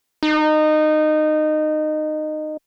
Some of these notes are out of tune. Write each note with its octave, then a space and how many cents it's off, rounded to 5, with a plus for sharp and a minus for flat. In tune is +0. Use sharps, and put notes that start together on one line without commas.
D#4 -20